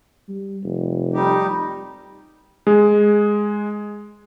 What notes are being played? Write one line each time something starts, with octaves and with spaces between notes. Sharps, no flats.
G3
F1
G3 D#4 G4
G#3 G#4